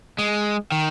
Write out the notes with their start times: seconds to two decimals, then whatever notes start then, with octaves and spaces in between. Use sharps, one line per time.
0.18 G#3
0.72 D#3